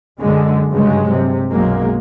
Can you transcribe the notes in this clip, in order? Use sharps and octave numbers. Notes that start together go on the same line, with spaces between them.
F#2 D3 G#3
G2 C#3 F#3 G#3
C3
B1 F#2 F#3 G#3 A#3